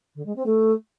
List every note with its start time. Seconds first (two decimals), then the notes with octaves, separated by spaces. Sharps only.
0.15 D3
0.26 G#3
0.36 C4
0.46 A3